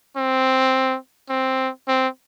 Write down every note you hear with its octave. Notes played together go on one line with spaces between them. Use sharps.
C4
C4
C4